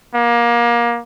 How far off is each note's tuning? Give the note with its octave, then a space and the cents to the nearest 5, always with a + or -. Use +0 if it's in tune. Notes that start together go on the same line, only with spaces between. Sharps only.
A#3 +25